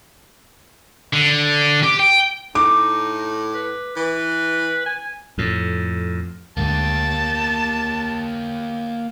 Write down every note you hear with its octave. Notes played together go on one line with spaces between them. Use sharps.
D3
G4
G5
A2 D#4 D6
B4
E3 B4
G#5
F2 A2
D2 G#2 D3 A#3 G4 A5